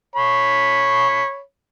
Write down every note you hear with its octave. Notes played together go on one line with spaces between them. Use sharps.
C#5 B5